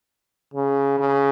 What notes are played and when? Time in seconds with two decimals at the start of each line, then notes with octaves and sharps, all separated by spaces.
0.54 C#3
0.99 C#3